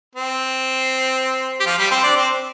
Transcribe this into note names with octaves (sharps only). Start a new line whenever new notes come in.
C4
G4
F3 F4
G3 G4
C4 C5
D4 D5
C4 C5